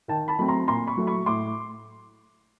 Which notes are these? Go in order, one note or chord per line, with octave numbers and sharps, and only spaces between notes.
D#3 G5 A5
A5 B5
F#3 A3 C4 B5
A#5 C6
A#2 A#5 C6
B5 C#6
F#3 A3
B5 C#6
A2 C6 D6